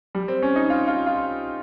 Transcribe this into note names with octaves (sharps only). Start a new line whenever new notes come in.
G3
C4
C#4
D#4
F4
F4
F4